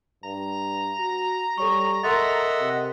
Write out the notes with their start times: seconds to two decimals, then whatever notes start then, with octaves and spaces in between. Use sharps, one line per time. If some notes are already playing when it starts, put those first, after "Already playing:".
0.24 G2 A#5
0.99 F#4
1.58 G3 A4 C#5 C#6
2.03 A4 A#4 D#5 E5 F#5 C6 A6
2.60 C3